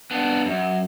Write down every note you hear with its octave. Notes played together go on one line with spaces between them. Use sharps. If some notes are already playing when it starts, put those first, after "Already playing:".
B3 D4
F#2